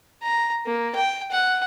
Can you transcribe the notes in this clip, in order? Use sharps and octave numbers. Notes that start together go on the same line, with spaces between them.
A#5
A#3
G5
F#5